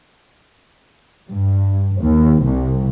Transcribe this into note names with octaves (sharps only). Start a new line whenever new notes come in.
G2
D#2
C2